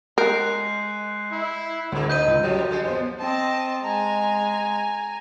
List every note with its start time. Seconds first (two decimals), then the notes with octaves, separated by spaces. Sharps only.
0.18 G#3 A#4 F#6 G6 C7
1.32 E4
1.92 D2 G#2 A#3
2.10 D#4 B4 D#5 G6 D#7
2.28 C#2
2.43 F#2 A2 F3 F#3 G4
2.70 D3 G#3
2.85 F3 B3 C5
3.19 C4 D#5 A5
3.84 G#3 G#5 A#5